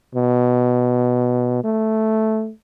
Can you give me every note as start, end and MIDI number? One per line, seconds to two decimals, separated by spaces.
0.15 1.60 47
1.64 2.51 57